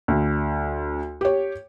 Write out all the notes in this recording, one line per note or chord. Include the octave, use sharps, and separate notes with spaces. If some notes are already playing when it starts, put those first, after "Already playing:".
D2
G4 C#5